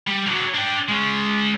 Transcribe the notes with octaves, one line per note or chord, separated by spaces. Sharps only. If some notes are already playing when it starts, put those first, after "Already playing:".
G3
D3 F#3
D4 G5
G#3 C#4